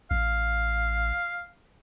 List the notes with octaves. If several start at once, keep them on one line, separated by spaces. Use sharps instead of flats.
A1 F5